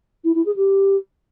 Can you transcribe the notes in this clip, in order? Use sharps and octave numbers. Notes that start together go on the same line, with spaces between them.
E4
E4
G#4
G4